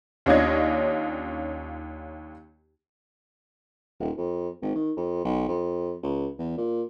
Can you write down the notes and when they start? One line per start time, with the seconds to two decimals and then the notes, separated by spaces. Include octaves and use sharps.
0.26 D#2 C#4 D4 F4 D#5 G#6
4.00 D#1
4.18 F2
4.62 G#1
4.75 D#3
4.97 F2
5.25 B1
5.48 F2
6.03 C#2
6.39 E2
6.58 A#2